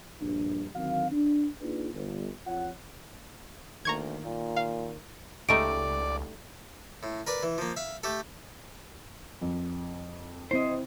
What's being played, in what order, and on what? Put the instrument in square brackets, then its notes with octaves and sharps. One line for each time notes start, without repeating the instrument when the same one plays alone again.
[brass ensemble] A#1 G2 D4
D3 D#3 F#3 C4 F5
D4
A#3 D4 D#4 F4 G#4 B4
G1
F2 F4 C#5 F#5
[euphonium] D2 [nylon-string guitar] D#3 A#3 [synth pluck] A#5 C#6 G#6
[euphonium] A#2
[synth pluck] F5
[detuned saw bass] C#2 [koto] G3 A3 D#4 [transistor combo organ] D5 [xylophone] D7
[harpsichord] A2
A#4 B4 D5
E3
F3 A#3
E5 F5
A3 G4 A4
[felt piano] F2
[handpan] C4 E4 [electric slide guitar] C5 D#5